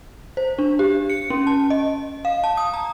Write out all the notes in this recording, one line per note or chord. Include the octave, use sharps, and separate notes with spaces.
C5
D4
G4
C#7
C#4
A5
D#5
F5
A5
D#6
A#5